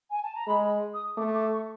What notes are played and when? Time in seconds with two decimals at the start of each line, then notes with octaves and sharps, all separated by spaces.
0.11 G#5
0.23 A5
0.35 A#5
0.47 G#3 B5
0.94 D#6
1.17 A3 D6
1.35 D6
1.52 C#6